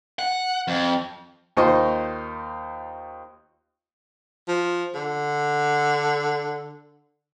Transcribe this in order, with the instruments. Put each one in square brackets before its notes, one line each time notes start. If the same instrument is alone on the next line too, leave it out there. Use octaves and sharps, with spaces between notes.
[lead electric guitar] F#5
F2
[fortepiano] D#2 D#4 F4 C5 D#5 C#6
[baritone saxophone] F3
D3